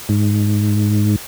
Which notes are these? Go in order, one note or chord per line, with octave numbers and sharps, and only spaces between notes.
G#2